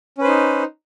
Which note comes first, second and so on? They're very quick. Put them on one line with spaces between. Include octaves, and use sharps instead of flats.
C#4 B4 C5 D#4